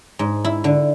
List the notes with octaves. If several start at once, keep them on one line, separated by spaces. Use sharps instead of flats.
G#2
E4
D3